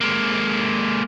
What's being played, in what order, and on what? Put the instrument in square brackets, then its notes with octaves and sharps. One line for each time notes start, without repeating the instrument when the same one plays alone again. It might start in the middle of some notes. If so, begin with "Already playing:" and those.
[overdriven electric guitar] G#3 A#3